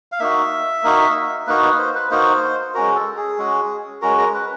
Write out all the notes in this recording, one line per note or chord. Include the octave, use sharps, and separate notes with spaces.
F5
A#3 D#4 F#4 E5
A#3 D#4 F#4
A#3 D#4 F#4 B4
B4
C5
B4
A#3 D#4 F#4 C5
G#3 C#4 F#4 A#4
A4
G#4
G#3 C#4 F#4
G#3 C#4 F#4 A#4
A#4
B4